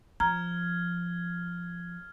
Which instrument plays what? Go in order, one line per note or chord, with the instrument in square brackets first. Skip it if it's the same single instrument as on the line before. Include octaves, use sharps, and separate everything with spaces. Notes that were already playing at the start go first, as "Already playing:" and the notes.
[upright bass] F3 [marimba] A#5 [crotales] F6 G#6